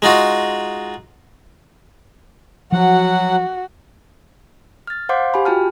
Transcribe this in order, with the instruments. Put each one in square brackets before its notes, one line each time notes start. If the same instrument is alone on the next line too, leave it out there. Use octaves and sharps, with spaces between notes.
[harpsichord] G#3 D#4 F4 F#4
[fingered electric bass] F3 [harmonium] F#3 F#5 [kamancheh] F#4
[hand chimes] F6 A6
C5 F5 F#5 C6 D6 G6
G4 G#5 B5
F4 F#4 G5 A5 F6